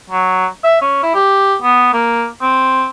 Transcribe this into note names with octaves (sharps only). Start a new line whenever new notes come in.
F#3
E5
C#4
E4
G4
B3
A#3
C4